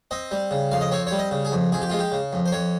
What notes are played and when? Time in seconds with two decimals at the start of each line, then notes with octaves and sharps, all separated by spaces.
0.11 C4 D#5
0.31 G3
0.51 C#3
0.71 F2 F5
0.81 D#5
0.91 C4 C#5
1.07 G3 C#5
1.19 D#5
1.31 C#3
1.45 G#4
1.52 F2
1.72 F2 G#4
1.81 G4
1.90 G#3 F4
1.99 G4
2.12 C#3
2.33 F2
2.46 C5
2.52 F2 C#5